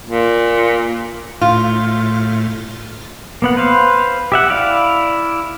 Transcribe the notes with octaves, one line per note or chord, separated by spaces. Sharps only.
A#2
A2 F4
A#3 B3 F#5
B4 C5 F5
G4 E5 F#5
E4 D5 F5